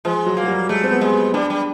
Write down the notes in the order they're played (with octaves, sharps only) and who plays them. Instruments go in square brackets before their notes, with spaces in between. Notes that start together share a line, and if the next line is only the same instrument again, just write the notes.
[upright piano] F3 [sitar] G#3
[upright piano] F#3
[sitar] A#3
[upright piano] F#3
G3
[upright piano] G#3 [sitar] A3
[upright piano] C4
B3
[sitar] G#3
[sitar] G3 [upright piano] D4
[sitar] G3